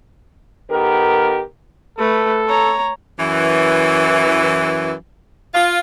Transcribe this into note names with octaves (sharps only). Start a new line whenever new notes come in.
D#3 B3 G4 A4 A#4
A3 A4 B4
C#5 A#5
F#2 E3
F4